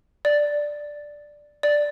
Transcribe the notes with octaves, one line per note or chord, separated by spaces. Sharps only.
D5
D5